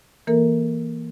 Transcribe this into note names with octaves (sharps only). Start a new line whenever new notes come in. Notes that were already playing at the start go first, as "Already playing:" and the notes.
E3 A#3 A4 A#4